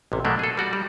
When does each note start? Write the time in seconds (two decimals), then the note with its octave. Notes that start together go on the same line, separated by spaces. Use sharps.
0.12 A1 C3
0.25 B2 F#3 A3 A#3 D4
0.39 G#4 A4
0.57 G3 F#4 D5
0.73 G3